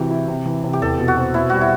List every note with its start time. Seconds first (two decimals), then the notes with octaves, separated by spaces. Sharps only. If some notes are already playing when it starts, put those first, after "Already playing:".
Already playing: C3 E3 F#4 G4
0.11 E4
0.28 C3
0.45 E3
0.64 C3
0.73 G4
0.81 E2 A4
0.98 B2
1.08 F#4
1.17 C4
1.34 B2 E4
1.50 G3 F#4
1.61 E4